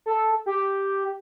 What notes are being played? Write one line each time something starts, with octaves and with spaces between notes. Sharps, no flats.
A4
G4